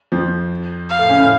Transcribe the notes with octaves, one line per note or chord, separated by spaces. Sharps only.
F2 F3
F5
A2 A3
C#3 C#4
A2 A3